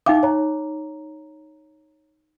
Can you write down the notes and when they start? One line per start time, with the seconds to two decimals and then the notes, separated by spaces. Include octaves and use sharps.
0.06 D#4 E5 F5 G5 D6
0.23 C#5 A#5